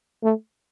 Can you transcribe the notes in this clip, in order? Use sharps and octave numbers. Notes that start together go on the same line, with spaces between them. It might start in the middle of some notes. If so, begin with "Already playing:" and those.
A3